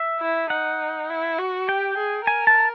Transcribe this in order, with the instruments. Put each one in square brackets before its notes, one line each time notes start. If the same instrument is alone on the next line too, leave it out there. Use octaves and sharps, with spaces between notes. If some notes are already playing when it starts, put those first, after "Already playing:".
Already playing: [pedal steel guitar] E5
[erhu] E4
[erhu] D#4 [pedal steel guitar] F#5
[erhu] E4
F#4
[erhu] G4 [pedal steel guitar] G5
[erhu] G#4
[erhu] A#4 [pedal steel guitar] G#5
[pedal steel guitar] A5